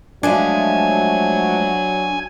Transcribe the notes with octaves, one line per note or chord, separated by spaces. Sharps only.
F3 F#3 G#3 A3 D4 G#5